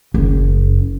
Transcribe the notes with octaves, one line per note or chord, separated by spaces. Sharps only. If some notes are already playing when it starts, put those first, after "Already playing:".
F#1